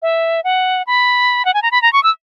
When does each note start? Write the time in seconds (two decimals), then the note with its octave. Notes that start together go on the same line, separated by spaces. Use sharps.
0.02 E5
0.44 F#5
0.87 B5
1.45 F#5
1.54 G#5
1.62 A#5
1.71 B5
1.82 A#5
1.93 C#6
2.03 E6